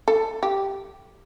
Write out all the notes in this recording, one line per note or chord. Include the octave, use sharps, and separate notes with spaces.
A4
G4